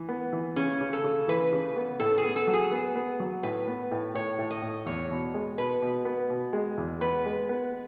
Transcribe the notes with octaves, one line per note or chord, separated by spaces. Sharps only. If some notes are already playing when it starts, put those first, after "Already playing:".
Already playing: E3
B3
E3
C#3 C#4
C#3
A4
C#3
E3 B4
C#3
B3
A2 A4
G#4
B3
A4
F#3
G#4
B3
B3
F#3
A2 B4
B3
A2
A2 C#5
A2
D#5
A2
E2 C#5
B2
G#3
B2 B4
B2
B3
B2
G#3
E2
B3 B4
G#3
B3